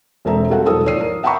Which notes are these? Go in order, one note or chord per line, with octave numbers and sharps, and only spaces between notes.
E1 G#3 C4 A4 E5 A#5
G3 C4 F#4 A4 F5 F#5
E1 E3 F#3 A4 D#6 E6
D#2 F3 C#5 D5 C7 D#7
A#4
E5 F#5 G5 A#5 B5 C#6